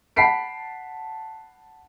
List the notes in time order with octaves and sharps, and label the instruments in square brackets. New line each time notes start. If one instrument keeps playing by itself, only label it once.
[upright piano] F#5 A5 B5 B6 C7 D7